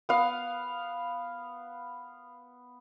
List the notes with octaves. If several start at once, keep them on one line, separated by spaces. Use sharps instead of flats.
B3 F5